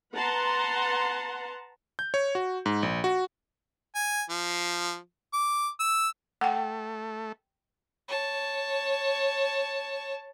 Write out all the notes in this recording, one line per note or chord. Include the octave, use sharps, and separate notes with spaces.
B4 F#5 A5 A#5 C6
G6
C#5
F#4
G#2
A#1
F#4
G#5
F3
D6
E6
A3 F#5 G5
C#5 A5